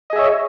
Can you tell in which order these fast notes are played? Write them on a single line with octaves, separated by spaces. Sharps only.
D#5 G#4 E5 C#5